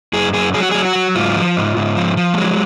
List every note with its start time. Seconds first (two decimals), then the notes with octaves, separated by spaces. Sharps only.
0.13 F#2 G#4
0.34 F#2 G#4
0.54 F#3 G#4
0.63 F#4
0.71 F#3 G#4
0.85 F#4
0.95 F#3
1.16 G#2 F4
1.36 F3
1.57 G#2
1.77 G#2
1.97 F3
2.17 F3
2.34 A3
2.38 F#3 G#3